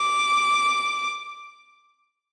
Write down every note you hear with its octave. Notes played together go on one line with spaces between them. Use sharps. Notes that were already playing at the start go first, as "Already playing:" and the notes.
Already playing: D6